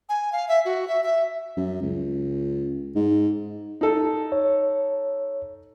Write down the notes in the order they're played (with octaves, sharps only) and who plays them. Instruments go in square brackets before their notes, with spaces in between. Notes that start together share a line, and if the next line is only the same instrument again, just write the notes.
[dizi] G#5
F5
E5
F#4
E5
E5
[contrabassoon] F#2
C#2
G#2
[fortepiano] D#4 A4
[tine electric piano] C#5